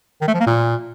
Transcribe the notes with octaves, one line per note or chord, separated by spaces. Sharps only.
D#3
A3
F3
A#3
A#2